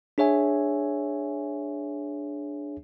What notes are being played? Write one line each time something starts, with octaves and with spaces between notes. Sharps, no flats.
D4 G#4 C#5 E5 G#5